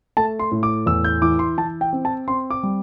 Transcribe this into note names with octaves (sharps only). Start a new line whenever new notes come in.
A3 A5
C6
A2
D6
E2 E6
G6
E3 D6
C6
E3 A5
G5
C4
A5
C4 C6
D6
G3